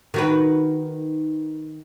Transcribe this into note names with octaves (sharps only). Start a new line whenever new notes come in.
D#3 F#4 B4